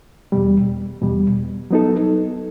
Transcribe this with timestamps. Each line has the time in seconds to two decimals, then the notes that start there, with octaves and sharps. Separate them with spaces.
0.32 E2 B2 G3
1.02 E2 B2 G3
1.71 F#3 B3 D#4 A4